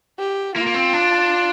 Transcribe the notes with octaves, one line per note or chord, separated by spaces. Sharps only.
G4
A#3 F4
A#3
C4
D4